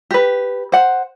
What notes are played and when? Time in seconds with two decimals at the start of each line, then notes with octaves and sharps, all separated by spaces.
0.11 G4 B4
0.72 C5 F#5